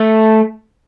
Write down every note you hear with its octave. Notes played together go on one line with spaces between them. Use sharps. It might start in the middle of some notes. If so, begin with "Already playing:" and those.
Already playing: A3